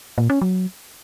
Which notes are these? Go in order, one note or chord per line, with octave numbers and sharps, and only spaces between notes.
A#2
C#4
F#3